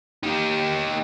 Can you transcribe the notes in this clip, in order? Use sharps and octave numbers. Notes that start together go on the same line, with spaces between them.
D#4 G4